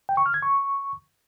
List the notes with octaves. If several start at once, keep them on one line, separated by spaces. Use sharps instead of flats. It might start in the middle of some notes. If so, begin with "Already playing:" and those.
G5
C#6
F6
G#6
C#6